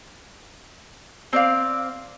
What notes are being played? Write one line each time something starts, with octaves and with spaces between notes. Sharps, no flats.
C4 D5 F5